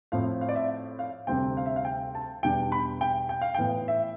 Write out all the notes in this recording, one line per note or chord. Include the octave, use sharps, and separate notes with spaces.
A2 F3 C4 F5
F5
D5
E5
F5
D2 C3 G3 C4 G5
F5
E5
F5
G5
A5
E2 B2 G3 D4 G5
B5
G5
G5
F5
A2 E3 B3 G5
E5